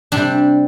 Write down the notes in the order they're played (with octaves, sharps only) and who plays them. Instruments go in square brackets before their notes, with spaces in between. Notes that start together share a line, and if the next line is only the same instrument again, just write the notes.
[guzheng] C3 G3 D4